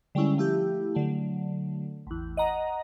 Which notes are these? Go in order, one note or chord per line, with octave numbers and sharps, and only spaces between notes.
D3 G3 G#3 C#4 E4
F3 A3 E4 G4
D3 F#3 A3
A1 E2
D#5 F#5 A#5